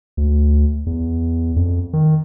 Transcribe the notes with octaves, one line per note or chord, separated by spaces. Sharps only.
D2
E2
F2
D#3